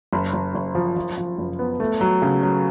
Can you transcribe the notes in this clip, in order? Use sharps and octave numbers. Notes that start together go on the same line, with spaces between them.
F#1
F#1
F#1
F3
F3
F3
F#1
B3
A3
F#3
C#3
F#3